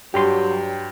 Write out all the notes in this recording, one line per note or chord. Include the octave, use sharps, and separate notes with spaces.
G2 F#3 G4 G5 C6